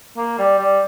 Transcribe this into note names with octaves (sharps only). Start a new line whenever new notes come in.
A#3
G3
G3